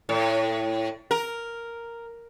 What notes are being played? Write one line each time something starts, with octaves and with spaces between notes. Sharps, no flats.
A2
A#4